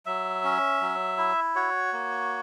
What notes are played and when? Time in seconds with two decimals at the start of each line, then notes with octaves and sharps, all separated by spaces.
0.06 F#3 E5
0.44 C#4
0.81 F#3
1.18 E4
1.55 F#4 C#5
1.93 A#3